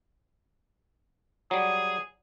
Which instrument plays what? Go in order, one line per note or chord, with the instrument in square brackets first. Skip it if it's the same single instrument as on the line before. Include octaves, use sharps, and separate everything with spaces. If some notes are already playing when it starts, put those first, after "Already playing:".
[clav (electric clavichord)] F#3 G3 [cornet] G#4